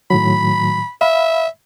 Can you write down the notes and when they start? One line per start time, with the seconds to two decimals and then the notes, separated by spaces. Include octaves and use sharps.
0.10 A2 D#3 F#3 B5
1.01 E5 F5 B5